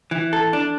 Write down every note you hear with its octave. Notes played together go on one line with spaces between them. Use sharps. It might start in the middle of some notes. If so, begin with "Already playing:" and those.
E3
A4
D4